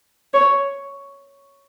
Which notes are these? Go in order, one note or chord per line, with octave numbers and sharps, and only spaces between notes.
C#5